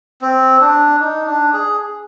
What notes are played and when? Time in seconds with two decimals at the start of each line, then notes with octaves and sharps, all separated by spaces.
0.21 C4
0.61 D4
1.00 D#4
1.27 D4
1.53 G#4